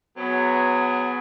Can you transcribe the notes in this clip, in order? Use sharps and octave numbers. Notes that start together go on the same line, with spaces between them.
F#3 B3 G#4